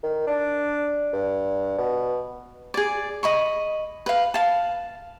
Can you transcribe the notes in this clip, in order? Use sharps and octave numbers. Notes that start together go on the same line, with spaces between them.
D#3
D4
G2
B2
G#4 D5
D#5 B5 C#6
B4 F5
F5 A5